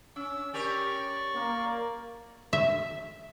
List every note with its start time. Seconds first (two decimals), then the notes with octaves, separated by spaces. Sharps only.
0.16 C#4 E6
0.53 C#4 G4 A#4 D5 C#6
1.36 A#3
2.53 E5